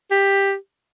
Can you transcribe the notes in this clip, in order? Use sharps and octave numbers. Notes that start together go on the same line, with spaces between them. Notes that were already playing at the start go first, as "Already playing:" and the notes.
G4